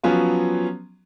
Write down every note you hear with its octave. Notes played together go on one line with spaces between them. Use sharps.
F3 F#3 B3 C#4 F4